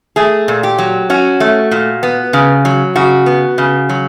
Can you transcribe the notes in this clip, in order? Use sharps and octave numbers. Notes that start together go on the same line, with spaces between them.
A3 G#4
A#2
G4
F#3
C#4 F#4
A3
A#2
B3
C#3
F#3
C#3 F#4
B3
C#3
F#3